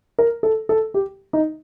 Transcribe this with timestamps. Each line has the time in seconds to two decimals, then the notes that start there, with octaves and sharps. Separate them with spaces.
0.19 A#4
0.43 A4
0.69 A4
0.94 G4
1.33 D#4